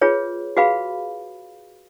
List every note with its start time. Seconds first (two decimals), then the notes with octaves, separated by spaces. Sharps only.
0.01 F4 G#4 B4 C#5
0.57 F#4 G#4 B4 F5 B5